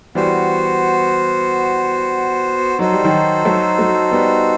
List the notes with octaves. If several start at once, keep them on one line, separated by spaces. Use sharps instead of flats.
E3 G3 B3 F#4 C5
F#3 D#4 F#4 A4 C5
G3
D#3 F#3
F#3 A3
F#3 A3
G3 B3